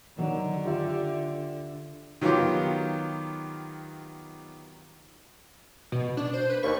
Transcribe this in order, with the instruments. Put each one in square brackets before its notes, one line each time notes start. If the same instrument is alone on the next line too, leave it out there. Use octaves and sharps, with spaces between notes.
[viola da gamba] D3 [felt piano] D#3 F#3
[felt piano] F4 G4 E5
[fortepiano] D#3 F#3 B3 F4 G4
[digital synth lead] B2
D4
C5
B4
[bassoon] D#2 [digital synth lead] C#6